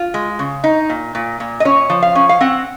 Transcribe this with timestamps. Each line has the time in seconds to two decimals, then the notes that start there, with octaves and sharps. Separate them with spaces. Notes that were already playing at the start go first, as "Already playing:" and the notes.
Already playing: F4
0.14 G#3
0.39 C#3
0.64 D#4
0.90 A#2
1.15 A#2
1.40 A#2
1.60 D#5
1.65 C#4 C#5
1.90 F3
2.03 F5
2.15 C#4
2.29 F5
2.41 C4 F#5